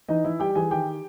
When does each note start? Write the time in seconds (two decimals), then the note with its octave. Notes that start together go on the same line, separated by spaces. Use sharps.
0.09 E3 D#4 D#5
0.24 E3 E4 E5
0.40 G3 G4 G5
0.55 E3 G#4 G#5
0.71 D#3 G4 G5